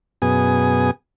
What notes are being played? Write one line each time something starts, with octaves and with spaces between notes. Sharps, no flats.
F#2 B2 B3 G#4 G#5 D#6